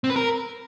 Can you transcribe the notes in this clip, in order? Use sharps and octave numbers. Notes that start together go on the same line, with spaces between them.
C4
B4
A#4